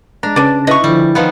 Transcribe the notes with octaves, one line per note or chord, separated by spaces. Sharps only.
G#3 D4 A#5
C#3 C#4 B4 D5 A5
E4 B4 D#5 C#6
D3 F3 G3
D#3 F3 B3